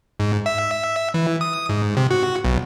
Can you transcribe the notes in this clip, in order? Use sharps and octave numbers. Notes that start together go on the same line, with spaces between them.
G#2
E5
E3
D#6
G#2
C3
F#4
B1